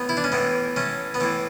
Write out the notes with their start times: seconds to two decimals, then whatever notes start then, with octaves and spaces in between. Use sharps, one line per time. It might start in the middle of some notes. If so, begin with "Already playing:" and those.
Already playing: A2 E3 B3
0.09 E4
0.17 D4
0.24 C#4
0.32 A2 E3 B3
0.76 A3 C#4
1.14 B3
1.20 A2 E3 A3